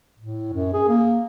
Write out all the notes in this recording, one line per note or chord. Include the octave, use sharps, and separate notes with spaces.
A2
F#2
G#4
A#3